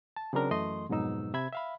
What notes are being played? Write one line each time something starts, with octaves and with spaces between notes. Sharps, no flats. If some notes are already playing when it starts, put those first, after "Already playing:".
A5
C#3 F#3 C4 D4 A#4
F#2 E3 A3 D#5 C6
F2 G#2 B2 F#3 D#4 E6
C3 E5 B5 G#6
E5 F5 B5